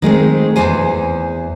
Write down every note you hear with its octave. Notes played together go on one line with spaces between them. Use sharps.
D#3 G#3 A3 C4
E2 G#2 E3 C5 G#5